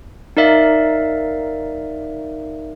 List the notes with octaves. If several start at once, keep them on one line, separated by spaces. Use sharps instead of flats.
D#4 A#4 D5 E5 F5